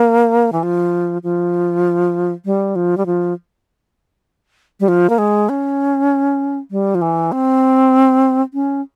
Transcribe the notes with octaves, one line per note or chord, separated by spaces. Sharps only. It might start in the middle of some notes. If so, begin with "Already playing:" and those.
Already playing: A#3
E3
F3
F3
G3
F3
G3
F3
G3
F3
A#3
G#3
C#4
G3
F3
E3
C4
C#4